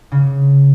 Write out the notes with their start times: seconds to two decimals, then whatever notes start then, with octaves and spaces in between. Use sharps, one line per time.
0.12 C#3